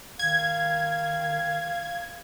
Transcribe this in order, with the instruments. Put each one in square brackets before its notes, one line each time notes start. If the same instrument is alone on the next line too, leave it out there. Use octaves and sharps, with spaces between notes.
[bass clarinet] D#3 [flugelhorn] F5 [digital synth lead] G#6